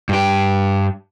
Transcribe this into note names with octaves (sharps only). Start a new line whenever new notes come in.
G2 G4